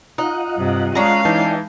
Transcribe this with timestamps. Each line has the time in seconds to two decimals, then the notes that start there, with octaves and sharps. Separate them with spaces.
0.18 D#4 F4 D#5 F#5
0.57 G2 C3
0.95 G#3 C#4 D4 F5 A#5
1.25 E3 D#4 E4 D5 G5 A5